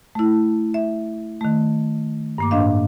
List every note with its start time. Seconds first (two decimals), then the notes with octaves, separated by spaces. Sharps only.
0.15 A3 E4
0.74 E5
1.41 D#3 A3
2.38 G2 A#3 D6
2.51 A2 D4 D#5 F5